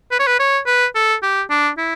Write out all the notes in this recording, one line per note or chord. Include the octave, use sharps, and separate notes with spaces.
B4
C#5
B4
C#5
B4
A4
G4
D4
E4